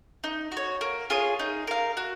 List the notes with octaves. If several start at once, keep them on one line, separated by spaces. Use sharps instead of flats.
D#4
F#4 C#5
A#3
F4 G#4 C#5
D#4
A#4 F5
F#4